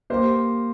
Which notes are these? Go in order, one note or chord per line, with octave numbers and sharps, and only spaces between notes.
A#3 G4 C5